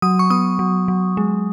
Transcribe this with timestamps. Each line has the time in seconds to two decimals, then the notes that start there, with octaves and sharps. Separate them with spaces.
0.02 F#3 D#6
0.19 C#6
0.30 B3 D#6
0.59 F#3
0.88 F#3
1.17 G#3